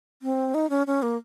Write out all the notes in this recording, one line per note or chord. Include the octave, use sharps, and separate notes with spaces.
C4
D#4
C#4
C#4
A#3